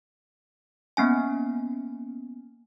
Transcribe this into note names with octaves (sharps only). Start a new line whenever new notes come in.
A#3 B3 C#4 G#5